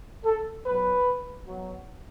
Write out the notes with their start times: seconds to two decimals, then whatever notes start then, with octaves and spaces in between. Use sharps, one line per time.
0.24 A4
0.65 B2 F#3 B4
1.45 B2 F#3